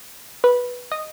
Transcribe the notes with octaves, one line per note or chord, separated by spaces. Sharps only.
B4
D#5